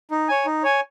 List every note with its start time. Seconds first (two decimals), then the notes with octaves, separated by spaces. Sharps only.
0.11 D#4
0.28 C#5 G#5
0.46 D#4
0.63 C#5 G#5